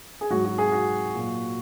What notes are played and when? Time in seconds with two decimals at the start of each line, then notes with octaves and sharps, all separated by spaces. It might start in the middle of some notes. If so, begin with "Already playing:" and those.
0.21 G#4
0.31 G#2 F#3 F#4
0.45 F#4
0.58 G#4
0.72 F#4
1.14 A#2 F#3